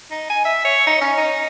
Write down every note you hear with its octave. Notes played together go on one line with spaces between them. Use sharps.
D#4
G#5
E5
C#5
D#4
C#4
D#4